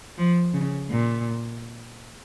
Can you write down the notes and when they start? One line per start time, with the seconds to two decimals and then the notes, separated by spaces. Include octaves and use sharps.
0.18 F3
0.54 C#3
0.91 A#2